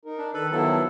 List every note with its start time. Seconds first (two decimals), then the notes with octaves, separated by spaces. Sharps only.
0.05 D#4 A#4
0.18 D4
0.34 D#3 A4 B4 B5
0.52 D#3 F3 F#3 B3 E4 A4